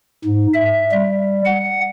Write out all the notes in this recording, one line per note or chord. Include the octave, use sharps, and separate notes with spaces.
G#2
E5
G3
F#5